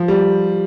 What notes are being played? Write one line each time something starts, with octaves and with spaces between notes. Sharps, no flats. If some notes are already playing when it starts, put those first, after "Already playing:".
Already playing: F3
G3